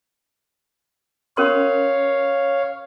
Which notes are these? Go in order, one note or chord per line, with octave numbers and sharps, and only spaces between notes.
C#4 A#4 C#5 F5 C6